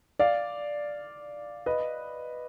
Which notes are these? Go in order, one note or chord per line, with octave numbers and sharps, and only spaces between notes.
D5 F5
B4 D#5